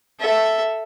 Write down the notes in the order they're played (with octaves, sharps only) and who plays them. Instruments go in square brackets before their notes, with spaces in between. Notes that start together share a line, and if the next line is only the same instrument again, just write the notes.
[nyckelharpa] A4 [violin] E5